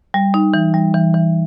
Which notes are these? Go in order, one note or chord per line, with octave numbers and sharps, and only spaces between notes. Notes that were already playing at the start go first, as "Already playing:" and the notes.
G3
D#4
E3
G3
E3
E3